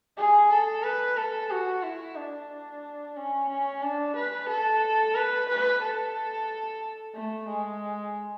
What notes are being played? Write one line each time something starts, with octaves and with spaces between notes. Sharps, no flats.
G#4
A4
B4
A4
F#4
E4
D4
C#4
C#4
D4
B4
A4
B4
B4
A4
A3
G#3